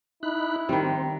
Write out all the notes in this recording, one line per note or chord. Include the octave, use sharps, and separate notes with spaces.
D#4 E4 B5 F#6
D#3 G3 C4